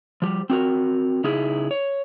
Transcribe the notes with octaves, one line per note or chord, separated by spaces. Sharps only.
F3 G3
C4 F#4 A#4
C#3 D#4 E4 G#4
C#5